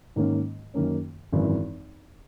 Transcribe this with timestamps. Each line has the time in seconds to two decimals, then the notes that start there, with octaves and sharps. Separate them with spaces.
0.16 G#2 D#3 A#3 C#4
0.74 F#2 D#3 A#3 C#4
1.33 G#1 F#2 E3